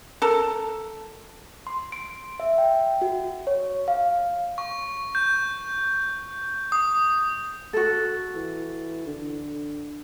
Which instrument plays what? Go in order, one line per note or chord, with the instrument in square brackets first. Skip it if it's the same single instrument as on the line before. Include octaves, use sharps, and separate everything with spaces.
[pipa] A4 A#4
[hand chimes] C6
D7
E5
G5
F#4
C#5
F5
[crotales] C#6
G6
D#6
[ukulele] F#4 A4
[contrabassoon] E3
D3